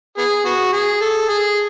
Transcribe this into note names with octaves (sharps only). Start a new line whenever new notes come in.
B3 G#4
B3 F#4
G#4
A4
G#4